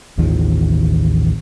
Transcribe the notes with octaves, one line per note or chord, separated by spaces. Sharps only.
A1 D#2 D#3 F3